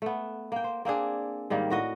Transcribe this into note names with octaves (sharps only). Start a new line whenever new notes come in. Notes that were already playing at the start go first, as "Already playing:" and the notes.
A3 B3
A#3 G5
C5
A#3 C4 D4 G#4
G#2 D#3 G3 A#3
A2 F#4 D#5